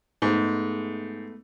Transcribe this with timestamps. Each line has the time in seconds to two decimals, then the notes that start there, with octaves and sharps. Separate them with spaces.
0.22 G#2 G#3 A3 B3